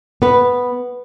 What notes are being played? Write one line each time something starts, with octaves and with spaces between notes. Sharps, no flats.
B3 B4